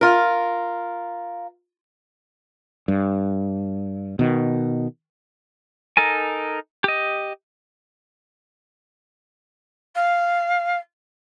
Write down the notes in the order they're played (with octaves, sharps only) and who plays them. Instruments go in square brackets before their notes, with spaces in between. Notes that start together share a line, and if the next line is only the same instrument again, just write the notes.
[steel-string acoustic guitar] F4 A#4
[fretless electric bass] G2
B2 D#3
[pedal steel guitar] D#4 A4 A#4 G#5
G4 D#5
[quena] F5